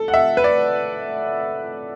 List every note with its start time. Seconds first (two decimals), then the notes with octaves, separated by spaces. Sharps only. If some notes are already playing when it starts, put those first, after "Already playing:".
Already playing: A4
0.08 F#5
0.14 E5
0.37 B4
0.44 D5